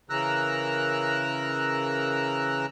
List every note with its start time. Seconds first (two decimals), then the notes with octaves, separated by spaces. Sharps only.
0.10 C#3 E3 A#4 A#5 E6 F#6